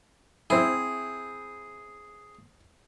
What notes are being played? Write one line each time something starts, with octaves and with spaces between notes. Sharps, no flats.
C4 E4 G#4